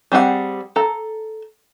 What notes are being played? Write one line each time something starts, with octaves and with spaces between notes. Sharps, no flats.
G3 C4 G#4 A4 F#5
A4 A#5